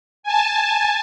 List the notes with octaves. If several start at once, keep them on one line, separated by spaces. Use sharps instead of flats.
G#5 A5